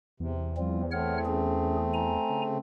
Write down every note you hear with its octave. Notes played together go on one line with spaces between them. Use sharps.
E2 C3
F3 G3 C4 F4
A3 C4 C#5 F#5 F6
C#4 G#4
G#5 A#5
C#3